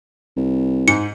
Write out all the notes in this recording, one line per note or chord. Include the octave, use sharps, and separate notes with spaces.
C2
G#2 C#7